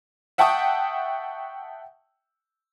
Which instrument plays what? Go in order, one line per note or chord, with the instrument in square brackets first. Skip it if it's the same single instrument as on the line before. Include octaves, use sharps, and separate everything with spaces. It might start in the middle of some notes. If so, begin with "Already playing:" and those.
[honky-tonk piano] E5 F#5 G5 A5 C#6 D#6